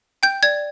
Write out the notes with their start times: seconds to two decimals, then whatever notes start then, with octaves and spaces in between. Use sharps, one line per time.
0.23 G5 G6
0.43 D5 G#6